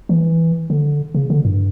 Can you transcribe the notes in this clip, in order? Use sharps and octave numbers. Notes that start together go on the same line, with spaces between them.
E3
D3
C#3
D3
G2